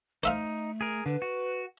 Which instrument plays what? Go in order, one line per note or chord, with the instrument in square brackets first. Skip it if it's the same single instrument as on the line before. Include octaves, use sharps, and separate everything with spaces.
[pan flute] A3 [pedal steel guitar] D#4 [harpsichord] C5 E5 F5
[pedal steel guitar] G#4 A#4
[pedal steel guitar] D3 [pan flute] B4
[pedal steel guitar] F#4